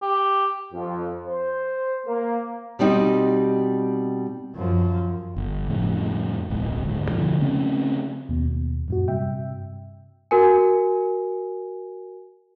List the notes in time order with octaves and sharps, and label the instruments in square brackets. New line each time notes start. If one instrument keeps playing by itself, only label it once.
[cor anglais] G4
[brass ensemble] F2
C5
A#3
[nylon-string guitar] B2 G3 C4 D#4
[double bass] F#2 F3
[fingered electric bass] G1
F2 A2 C#3
D1 B1 G#3
D2 G#2
B2 D3 F3
C#3 A3 C4 C#4
[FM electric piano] D#2 B2
F#2 A#2 F#4
G2 C3 E5 G5
[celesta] F#4 A#4 G#5